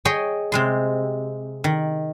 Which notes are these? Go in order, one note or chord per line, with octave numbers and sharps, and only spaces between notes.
G#4 C#5 D#5 G5
C3 G#3 C6
D#3